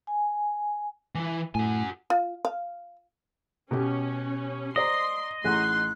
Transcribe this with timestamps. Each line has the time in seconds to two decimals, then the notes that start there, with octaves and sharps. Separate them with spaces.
0.07 G#5
1.15 E3 E4
1.55 A2 F#4 G#5
2.10 F4
2.45 F5
3.71 B2 C#4 G4
4.76 C5 D5 D#5 A#5 C6
5.44 A1 D#4 G#4 F#5 C6 F#6